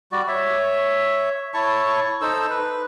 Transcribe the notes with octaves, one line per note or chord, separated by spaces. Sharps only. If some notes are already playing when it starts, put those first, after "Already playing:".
G3 F#4 D5
C#5 E5
E4 C#5 A5 C#6
D#4 A4 C5 E6
B4